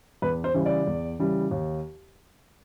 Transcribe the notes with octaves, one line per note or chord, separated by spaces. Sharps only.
E2 B4
C5
C#3 E3 G3
D5
E2
C#3 E3 G3
D#2